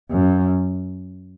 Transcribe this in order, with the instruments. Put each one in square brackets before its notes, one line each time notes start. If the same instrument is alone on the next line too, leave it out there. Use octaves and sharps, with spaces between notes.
[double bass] F#2